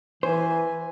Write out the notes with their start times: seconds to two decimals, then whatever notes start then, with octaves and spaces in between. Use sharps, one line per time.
0.23 E3 B4 C5 G#5